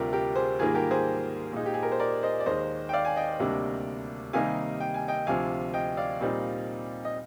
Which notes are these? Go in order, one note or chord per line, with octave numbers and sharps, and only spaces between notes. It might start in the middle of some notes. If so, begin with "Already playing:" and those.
Already playing: D2 C3 G3 D4 F4 G4 A#4
G4 A#4
G#4 C5
G#2 D#3 G3 A#3 F4 G#4
G4 A#4
G#4 C5
A#2 G#3 D#4
G4
G#4
A#4
C5
A#4 D5
C5 D#5
D5
D#2 D#3 G#3 C5 D#5
G5
D5 F5
G#5
D#5 G5
D2 C3 G3 A#3 D4
C3 D#3 G3 A#3 D#4 F5 G#5
G5
G#5
D#5 G5
D2 C3 F3 F5 G#5
D#5 G5
D5 F5
A#2 G3 C4 D#4
D#5